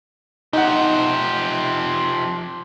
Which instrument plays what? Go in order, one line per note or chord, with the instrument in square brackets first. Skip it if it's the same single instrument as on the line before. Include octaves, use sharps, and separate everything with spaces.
[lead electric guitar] F3 G4 [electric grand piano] D#4 F#5